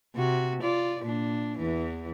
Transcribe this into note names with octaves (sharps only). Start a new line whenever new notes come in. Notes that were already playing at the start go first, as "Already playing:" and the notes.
C3 F#4
F4 D5
A#2 D4
E2 E3